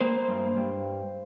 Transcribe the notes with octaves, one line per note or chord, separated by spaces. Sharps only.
A#3 C5
G2
G2